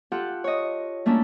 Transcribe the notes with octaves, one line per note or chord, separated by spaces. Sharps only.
F4 G4 A4 F#5
C#5 D#5
A3 A#3 C#4 D4 E4 A4